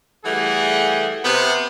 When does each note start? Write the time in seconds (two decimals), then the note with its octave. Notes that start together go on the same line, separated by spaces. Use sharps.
0.24 E3 G3 A3 G#4 F#5
1.24 C3 B3